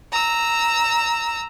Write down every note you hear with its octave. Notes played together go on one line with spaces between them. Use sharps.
A#5 E6